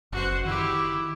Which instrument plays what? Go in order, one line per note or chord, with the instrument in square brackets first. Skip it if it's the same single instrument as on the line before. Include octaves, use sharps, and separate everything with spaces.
[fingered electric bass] F#1 [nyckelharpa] F#4 C5
[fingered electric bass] D#3 [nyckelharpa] E4 G4